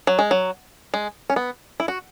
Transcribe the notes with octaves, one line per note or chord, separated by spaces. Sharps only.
F#3
G#3
F#3
G#3
C#4
B3
E4
F#4